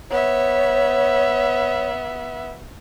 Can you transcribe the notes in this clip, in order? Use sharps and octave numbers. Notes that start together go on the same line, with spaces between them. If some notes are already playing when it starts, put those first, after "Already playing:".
B3 C#5 E5